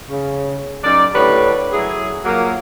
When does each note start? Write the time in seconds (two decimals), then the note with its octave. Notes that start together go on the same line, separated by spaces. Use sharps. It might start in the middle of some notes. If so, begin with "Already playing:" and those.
0.08 C#3
0.84 F#2 D#4 D5
1.14 A2 D3 G3 B4 C#5
1.72 F#3 E4 G#4
2.25 F3 F#3 A#3